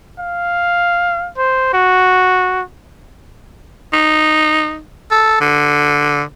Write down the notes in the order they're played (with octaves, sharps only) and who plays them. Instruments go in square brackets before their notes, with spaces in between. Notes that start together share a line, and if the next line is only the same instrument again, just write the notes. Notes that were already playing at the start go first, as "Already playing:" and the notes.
[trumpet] F5
C5
F#4
[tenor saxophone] D#4
A4
D3